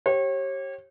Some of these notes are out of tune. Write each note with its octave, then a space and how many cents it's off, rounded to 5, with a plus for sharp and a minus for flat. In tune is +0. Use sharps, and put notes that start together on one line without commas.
G4 -20 C#5 -35